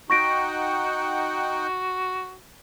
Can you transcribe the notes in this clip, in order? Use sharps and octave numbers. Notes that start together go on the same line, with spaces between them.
D#4 F#4 F#5 G5 C#6 A#6 D7